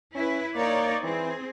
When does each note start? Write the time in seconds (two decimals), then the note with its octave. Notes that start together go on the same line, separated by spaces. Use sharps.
0.15 C#4 E4 B4
0.56 A#3 D#4 C#5 D5
1.04 E3 C4 G#4